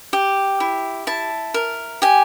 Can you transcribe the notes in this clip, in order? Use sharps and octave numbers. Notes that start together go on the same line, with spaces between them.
G4
E4
E4 A5
A#4
G4 G#5